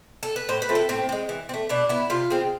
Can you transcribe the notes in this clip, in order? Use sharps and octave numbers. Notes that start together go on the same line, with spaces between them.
A4
B4
A2 C5
B4
F3 A3 C4
A4
A2 C4
G#3 C4
E3
C4
A3
B2 D4
B3 E4
C3 F4
G#3 C4